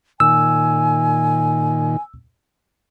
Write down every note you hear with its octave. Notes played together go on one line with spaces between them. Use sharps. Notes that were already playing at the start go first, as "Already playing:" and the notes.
A#2 D#3 G#5 E6